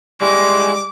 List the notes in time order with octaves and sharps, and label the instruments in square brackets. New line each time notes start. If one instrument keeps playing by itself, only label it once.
[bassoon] G3 [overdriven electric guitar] G#3 E4 [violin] D6